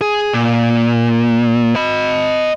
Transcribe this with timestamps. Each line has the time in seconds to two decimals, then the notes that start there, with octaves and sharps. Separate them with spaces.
0.01 G#4
0.34 A#2
1.76 D#5 B5